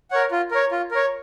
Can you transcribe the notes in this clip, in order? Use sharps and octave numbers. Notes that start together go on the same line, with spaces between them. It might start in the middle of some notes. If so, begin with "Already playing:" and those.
A#4 C#5 F#5
F4
A#4 C#5
F4
A#4 C#5